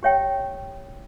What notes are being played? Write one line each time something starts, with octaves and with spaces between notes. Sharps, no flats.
G4 C#5 E5 G5